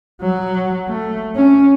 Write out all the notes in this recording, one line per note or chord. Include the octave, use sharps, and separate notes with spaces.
F#3
A3
C#4